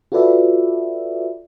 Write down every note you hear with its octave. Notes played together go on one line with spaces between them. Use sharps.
F4 F#4 A4 B4 D5 E5